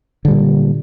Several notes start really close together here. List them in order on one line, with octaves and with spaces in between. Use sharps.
D3 G3 A#2